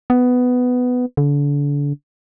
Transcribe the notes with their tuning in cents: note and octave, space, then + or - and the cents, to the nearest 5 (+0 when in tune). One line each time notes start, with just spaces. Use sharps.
B3 +10
D3 -35